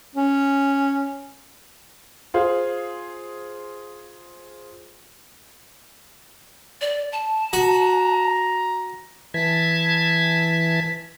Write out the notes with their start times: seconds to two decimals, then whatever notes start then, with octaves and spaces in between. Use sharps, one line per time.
0.15 C#4
2.34 F4 G#4 C5 F5
6.81 D5
7.12 A5
7.53 F#4 A#5
9.34 E3 A5 G#6 B6